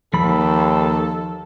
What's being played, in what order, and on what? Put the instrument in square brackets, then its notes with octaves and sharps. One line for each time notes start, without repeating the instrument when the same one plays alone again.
[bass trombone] D#2 [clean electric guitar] F3 B5 [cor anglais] A4